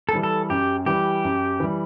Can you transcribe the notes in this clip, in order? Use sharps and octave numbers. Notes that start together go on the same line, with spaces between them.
A4
E3 G3
A4
F#2 G4
E3 G3 G4
F#2
E3 G3